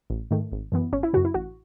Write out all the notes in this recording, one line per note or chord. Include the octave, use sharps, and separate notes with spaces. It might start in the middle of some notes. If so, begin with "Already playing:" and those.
A1
G#2 D#3 A3
G#1
F#2 E3 B3
G#1 C#4
E4
F#2 C#3 F#4
E4
A1 F#4